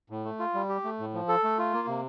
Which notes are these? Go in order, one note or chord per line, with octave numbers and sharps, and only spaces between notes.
A2
A3
F4
G3
G4
A3
A2
F3
A4
A3
F4
A#3
C3